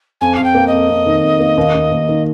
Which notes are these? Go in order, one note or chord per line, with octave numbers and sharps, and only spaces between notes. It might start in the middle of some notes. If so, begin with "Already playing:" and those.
F2 G#5
F2 F5
G5
A#3
F2 D#5
F2
D#3
F2
A#3
D#2
D#2
D#2
D#3